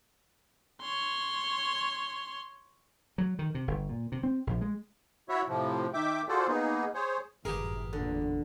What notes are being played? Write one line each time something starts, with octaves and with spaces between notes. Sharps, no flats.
C#5 C6
F#3
D#3
C3
G1
A#2
C3
C4
A#1
G#3
E4 F#4 C#5 E5
A2 C3 F3
D#3 E5 G5 D6
F4 F#4 G#4 A4 C5 D5
A#3 B3 D#4 G#4
G#4 C5 C#5
G1 F#2 A2 E3 G4 G#4 A#4
E2 A#2 D3